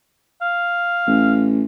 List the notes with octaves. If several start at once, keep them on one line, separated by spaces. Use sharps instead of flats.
F5
A1